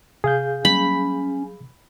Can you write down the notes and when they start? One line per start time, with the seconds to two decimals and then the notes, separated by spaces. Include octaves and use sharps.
0.24 C3 G#4 F5 G6
0.65 F#3 G3 A#3 C#4 B5